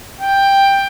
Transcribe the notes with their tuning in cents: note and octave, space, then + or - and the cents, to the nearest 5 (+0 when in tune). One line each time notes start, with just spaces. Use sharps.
G5 +10